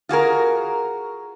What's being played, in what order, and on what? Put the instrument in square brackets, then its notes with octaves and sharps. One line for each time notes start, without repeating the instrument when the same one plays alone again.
[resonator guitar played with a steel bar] F4 F#4 G#4 A#4